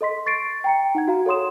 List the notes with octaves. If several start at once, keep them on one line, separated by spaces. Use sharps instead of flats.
A4 D#5 C6 B6
C#6 A6 C7 D7
G5 A#5 C#7
D#4 F#5 G#6
F#4 F5 A#5
A4 C#5 F#5 C6 D#6 E7